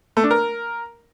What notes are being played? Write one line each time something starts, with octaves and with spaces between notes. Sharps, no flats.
A3
D4
A#4